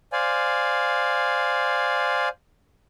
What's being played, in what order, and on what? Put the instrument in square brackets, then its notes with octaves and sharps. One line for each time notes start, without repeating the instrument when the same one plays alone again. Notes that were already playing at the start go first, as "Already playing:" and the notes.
[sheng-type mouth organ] C5 D5 F5 G#5